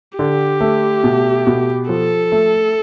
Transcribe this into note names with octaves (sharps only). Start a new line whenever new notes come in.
D3 G4
A3
B2
B2
F3 A4
A3